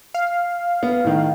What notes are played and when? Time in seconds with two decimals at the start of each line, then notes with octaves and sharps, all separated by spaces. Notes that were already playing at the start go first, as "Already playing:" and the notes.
0.14 F5
0.83 B3
1.04 A2 D#3